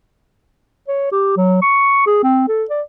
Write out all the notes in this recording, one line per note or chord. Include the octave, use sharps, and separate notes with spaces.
C#5
G4
F#3
C#6
G#4
C4
A4
D5